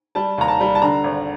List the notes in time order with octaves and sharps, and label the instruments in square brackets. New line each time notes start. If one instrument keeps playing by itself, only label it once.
[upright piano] G3 A5
D#2 A#5
A5
G3
A5
D3 A#5
G#1